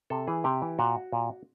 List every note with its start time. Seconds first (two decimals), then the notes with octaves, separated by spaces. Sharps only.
0.10 C3 A4
0.27 E3 G#4
0.44 C3 G4
0.62 E3
0.79 A#2 F#4
1.12 A#2